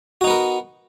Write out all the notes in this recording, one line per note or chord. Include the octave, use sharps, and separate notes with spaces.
B3 D#4 F#4 A#4